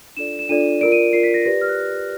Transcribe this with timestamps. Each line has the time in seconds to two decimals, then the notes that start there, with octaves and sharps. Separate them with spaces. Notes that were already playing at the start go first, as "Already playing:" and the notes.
0.17 D4 F4 A4 D5 E7
0.39 E7
0.49 D4 F4 A4 D5 D#7
0.81 F4 A#4 D5 D7
0.92 D#7
1.13 F4 A#4 D5 C7
1.23 B6
1.34 A#6
1.46 G4 B4 D5 A#6
1.61 F6
1.68 F#6